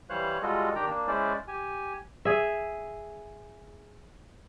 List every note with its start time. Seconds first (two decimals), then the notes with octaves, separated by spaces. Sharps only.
0.10 E3 G3 C5 C#5 F5 F#6
0.42 G3 G#3 F4 F#4 A4 D#5
0.75 D#3 D4 G4 G5 A#5
0.87 A#3 D4
1.08 G#3 C#4 E4 C5 D5
1.48 G4 G#5
2.25 G#4 E5